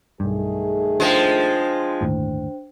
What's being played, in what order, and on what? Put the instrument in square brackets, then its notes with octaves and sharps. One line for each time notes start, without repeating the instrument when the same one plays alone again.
[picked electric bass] B1 G2 [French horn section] D#3 A3 G#4
[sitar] F3 G#3 [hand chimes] D4 C5 G5
[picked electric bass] G1 D#2 A2